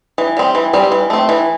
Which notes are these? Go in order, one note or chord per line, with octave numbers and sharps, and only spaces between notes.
E3
G3 C4
E3
G3 C4
E3
A3 C4
E3